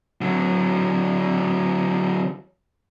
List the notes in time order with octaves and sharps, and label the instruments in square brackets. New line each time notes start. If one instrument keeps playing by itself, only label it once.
[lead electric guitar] D3 F#3